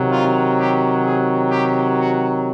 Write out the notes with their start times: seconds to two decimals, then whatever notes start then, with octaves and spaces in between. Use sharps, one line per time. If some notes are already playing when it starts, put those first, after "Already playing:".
Already playing: C3 D#3 F#3
0.11 F4
0.58 G4
1.04 G#4
1.51 G4
1.97 F#4